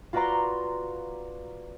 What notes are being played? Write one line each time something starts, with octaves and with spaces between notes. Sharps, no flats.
F4 F#4 B4 D5 A#5 C6